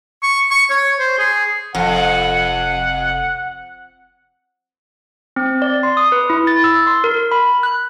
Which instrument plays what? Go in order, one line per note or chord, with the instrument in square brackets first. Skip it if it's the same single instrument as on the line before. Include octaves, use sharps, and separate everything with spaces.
[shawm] C#6
C#6
C#5
C5
G#4
[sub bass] F1 [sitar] F2 [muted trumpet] F#5
[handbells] C4
D5
C6
D#6
B4
E4
A6
E6
C6
A#4
B5
F#6